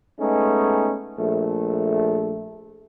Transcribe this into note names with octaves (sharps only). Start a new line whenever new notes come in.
G#3 A3 B3 C#4 D#4
A#1 A3